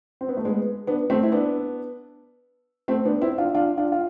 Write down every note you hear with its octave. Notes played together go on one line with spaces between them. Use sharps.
C4
B3
A3
G#3 B3
B3 D4
A3 C4
E4
B3 D4
A3 C4
B3 D4
C4 E4
D4 F4
D4 F4
D4 F4
F4